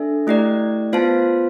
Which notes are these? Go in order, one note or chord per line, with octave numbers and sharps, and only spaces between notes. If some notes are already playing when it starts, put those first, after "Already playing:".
Already playing: D4 A4 E5
A3 E4 G4 D5
B3 F4 C5 F5 A5